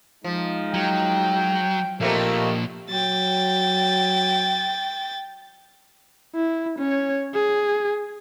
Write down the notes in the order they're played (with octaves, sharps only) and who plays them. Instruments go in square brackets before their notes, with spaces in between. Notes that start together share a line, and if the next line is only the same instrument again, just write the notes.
[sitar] F3 [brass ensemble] G#3 D#4
[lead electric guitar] F#3 [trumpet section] G5
[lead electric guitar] A#2 F3 [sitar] A3 A#3 C4 [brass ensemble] G4 A#4 D#5
[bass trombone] F#3 [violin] G5 A6
[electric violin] E4
C#4 C#5
G#4